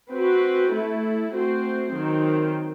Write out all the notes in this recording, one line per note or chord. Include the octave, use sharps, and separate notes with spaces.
C4 F#4 B4
A3 E4 A4
A3 C4 F#4 C5
D#3 F#3 C4